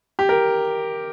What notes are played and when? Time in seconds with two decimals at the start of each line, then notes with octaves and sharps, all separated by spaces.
0.19 G4
0.29 A#4